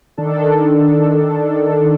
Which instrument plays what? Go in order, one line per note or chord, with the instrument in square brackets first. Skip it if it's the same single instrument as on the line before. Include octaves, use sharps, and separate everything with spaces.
[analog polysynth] D#3 D4 A4